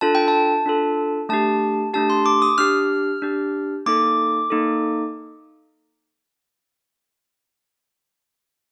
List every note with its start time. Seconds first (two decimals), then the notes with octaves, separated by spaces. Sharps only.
0.01 D4 F4 A4 A5
0.15 G5
0.28 A5
0.66 D4 F4 A4
1.29 A3 D4 G4 A5
1.94 A3 D4 G4 A5
2.10 C6
2.26 D6
2.42 D#6
2.58 D4 G4 F6
3.22 D4 G4
3.86 A#3 D#4 A4 D6
4.50 A#3 D#4 A4